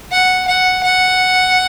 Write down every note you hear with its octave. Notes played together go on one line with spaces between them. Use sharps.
F#5
F#5
F#5